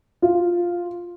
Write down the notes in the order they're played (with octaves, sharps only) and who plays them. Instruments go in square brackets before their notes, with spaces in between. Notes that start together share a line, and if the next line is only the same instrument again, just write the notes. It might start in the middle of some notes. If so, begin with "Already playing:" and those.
[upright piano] F4